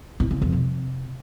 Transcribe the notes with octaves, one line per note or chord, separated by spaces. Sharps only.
A2
C#3
F2
C3